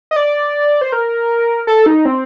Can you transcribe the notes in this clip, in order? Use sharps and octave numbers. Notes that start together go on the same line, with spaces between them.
D#5
D5
C5
A#4
A4
D#4
C4